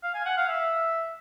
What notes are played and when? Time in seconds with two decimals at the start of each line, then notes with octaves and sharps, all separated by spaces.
0.03 F5
0.15 G#5
0.26 F#5
0.37 F5
0.48 E5